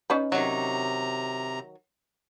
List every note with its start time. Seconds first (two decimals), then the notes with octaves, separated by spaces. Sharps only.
0.10 C#4 D#4 B4
0.32 C3 D#3 F#3 A#5